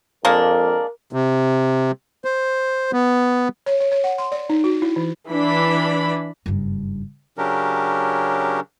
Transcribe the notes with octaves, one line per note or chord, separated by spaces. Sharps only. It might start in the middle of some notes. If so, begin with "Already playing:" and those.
F2 G#3 A#3 D4 A#4
C3
C5
B3
C#5
C#5
C#5
F#5
C6
D5
D#4
F#4
E4
E3
E3 D4 B5
F#1 G2
C#3 F#3 C#4 D4 G4 A#4